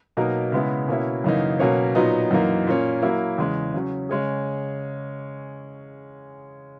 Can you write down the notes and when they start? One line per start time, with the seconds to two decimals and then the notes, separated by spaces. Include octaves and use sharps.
0.17 B2 F#3 A#3 D#4 A#4
0.52 C#3 G#3 B3 E4
0.88 B2 A#3 C#4 E4
1.24 F#2 C#3 E3 A#3 D#4
1.59 B2 F#3 A#3 C#4
1.95 A#2 F#3 B3 D#4
2.31 F#2 E3 A#3 D#4
2.67 A#2 A#3 C#4
3.02 F#3 A#3 E4
3.38 E2 C#3 G#3
3.74 C#3 F#3 C#4
4.09 C#3 G#3 C#4 G#4